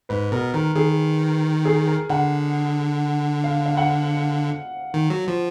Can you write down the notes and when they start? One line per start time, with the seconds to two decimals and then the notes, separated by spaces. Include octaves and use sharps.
0.09 G#2 B4
0.31 B2 A#4
0.54 D#3 A#4
0.76 D#3 G#4
1.65 G#4
1.87 A#4
2.10 D3 F#5
3.44 F5
3.66 F5
3.77 F#5
4.94 D#3
5.10 F#3
5.28 F3